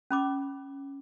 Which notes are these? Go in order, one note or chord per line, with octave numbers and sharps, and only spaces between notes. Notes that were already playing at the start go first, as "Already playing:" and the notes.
C#4 B5 D6